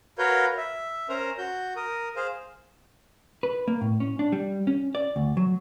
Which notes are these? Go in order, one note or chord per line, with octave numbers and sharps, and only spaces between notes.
F#4 A#4 B4 C#5 F5 G6
E5
C#4 A#4 C5 A#5
F#4 G6
A#4 D#6
G#4 C5 F5
B4
A#3
A2
C#4
D4
G3
C#4
D5
D2
F#3